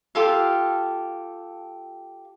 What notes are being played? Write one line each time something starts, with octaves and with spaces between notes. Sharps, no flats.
F4 G4 A4 F5